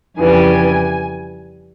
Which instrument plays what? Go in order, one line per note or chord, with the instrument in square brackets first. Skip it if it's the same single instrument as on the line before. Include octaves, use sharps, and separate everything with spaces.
[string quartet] F2 C#3 E3 G3 G#5